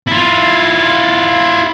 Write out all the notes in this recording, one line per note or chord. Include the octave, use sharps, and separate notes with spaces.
E4 F4